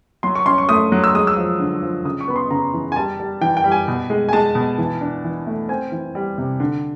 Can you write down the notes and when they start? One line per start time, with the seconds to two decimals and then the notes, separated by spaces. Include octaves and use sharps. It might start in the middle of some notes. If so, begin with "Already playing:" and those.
0.23 F#3 C6
0.35 C#6
0.46 C#4 C6
0.58 C#6
0.69 A3 D#6
0.92 F#3
1.04 E6
1.15 G#3 D#6
1.27 E6
1.37 F3
1.59 D3
1.82 F3
2.05 C#3 D#6
2.21 C#6
2.28 B3 B5
2.36 C6
2.51 C#3 A#5
2.73 E3
2.92 G#5
2.96 G3 A5
3.20 G3
3.41 E3 G5
3.57 G5
3.64 G3
3.72 G#5
3.88 B2
4.10 G#3
4.29 G#5
4.33 G#3 A5
4.55 B2
4.78 E3
5.01 D4
5.24 E3
5.47 A3
5.69 C4 G#5
5.92 E3
6.15 G3
6.38 C3
6.60 D3